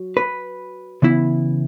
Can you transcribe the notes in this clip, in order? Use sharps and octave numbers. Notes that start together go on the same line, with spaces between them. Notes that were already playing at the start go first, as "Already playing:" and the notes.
Already playing: F#3
B4
C#3 E3 B3 E4